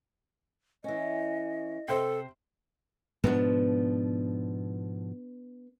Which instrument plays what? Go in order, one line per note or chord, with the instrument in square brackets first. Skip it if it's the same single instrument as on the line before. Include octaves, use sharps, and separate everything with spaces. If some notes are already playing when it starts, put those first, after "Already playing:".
[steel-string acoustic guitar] E3 C#4 [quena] D#5
[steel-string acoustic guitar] C3 [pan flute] A4 [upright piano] C5 G5
[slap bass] G#2 B2 F3 [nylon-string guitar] B3 D4